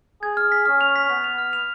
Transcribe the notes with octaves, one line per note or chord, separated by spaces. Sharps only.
G#4 G#6
F6
B6
C#4 F6
F7
B6
B3 B6
F7
F6
F7